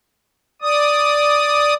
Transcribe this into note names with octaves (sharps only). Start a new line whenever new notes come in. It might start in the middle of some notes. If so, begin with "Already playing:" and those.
D5 D#6